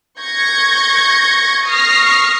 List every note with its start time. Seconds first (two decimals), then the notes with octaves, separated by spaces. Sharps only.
0.20 C#6 G6 G#6 A#6 C#7
1.66 C#6 D#6 F6 A#6 C7